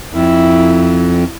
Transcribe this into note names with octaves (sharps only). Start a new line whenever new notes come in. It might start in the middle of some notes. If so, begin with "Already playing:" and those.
F2 E4